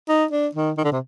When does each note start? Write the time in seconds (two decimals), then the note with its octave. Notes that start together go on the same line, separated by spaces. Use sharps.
0.09 D#4
0.31 D4
0.55 D#3
0.78 D#3
0.84 D3
0.92 C3